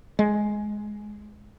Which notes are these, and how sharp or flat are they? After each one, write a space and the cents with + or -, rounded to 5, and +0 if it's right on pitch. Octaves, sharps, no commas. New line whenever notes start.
G#3 +10